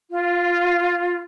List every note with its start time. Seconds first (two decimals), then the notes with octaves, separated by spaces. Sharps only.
0.10 F4